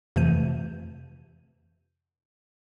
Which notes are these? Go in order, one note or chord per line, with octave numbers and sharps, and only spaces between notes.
F2 C3 E3 A3 G6 D#7